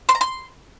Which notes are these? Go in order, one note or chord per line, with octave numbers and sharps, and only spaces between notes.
C6
A#5
C6